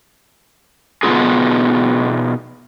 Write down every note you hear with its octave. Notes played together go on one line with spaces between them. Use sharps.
B2 D3 B3 D#4 F4 G#4